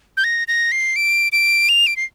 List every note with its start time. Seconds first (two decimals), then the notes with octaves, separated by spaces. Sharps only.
0.17 G6
0.24 A#6
0.48 A#6
0.72 C7
0.96 D7
1.32 D7
1.69 F7
1.87 D7
1.97 C7